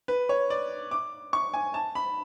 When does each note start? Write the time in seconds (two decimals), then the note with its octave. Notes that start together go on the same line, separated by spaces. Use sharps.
0.08 B4
0.29 C#5
0.50 D5
0.91 D6
1.33 C#6
1.54 G#5
1.74 A5
1.95 B5